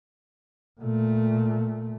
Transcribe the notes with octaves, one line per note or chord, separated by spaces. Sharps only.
A#2 A3